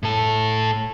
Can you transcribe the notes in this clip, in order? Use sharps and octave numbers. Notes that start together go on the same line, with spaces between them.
A2 A4